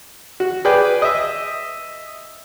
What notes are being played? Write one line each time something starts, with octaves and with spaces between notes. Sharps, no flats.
F#4
G#4 B4 D5 G5
D#5 E5